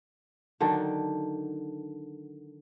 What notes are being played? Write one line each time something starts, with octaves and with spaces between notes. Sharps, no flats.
D3 D#3 F#3 D4